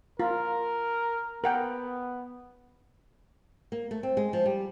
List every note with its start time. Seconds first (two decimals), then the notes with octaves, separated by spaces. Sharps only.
0.20 F4 A#4
1.44 B3 A#4 F#5 G5
3.72 A#3
3.91 A3
4.03 C4
4.17 G#3
4.33 F3
4.46 G3